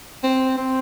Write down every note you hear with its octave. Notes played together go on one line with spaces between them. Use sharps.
C4
C4